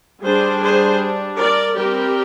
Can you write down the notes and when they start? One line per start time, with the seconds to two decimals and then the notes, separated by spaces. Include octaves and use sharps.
0.24 G3 D4 G#4 C5
0.62 G#4 C5
1.39 A#4 D5
1.77 G3 C4 G4 A#4